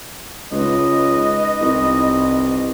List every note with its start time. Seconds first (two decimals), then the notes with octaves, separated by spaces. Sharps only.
0.51 C#2 D#4 B4 D#5
1.61 C2